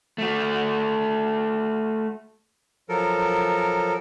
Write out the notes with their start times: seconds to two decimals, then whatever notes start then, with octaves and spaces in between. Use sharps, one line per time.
0.18 A3 F#4
2.89 F3 F#3 A4 A#4